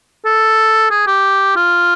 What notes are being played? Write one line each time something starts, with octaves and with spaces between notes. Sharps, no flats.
A4
G#4
G4
F4